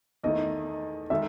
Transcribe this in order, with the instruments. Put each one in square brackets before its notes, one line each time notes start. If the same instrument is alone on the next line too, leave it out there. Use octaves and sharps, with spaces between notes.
[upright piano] E2 D#3 A3 [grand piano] D#5
[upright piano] D#3 G#3 D#4 A4 [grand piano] E5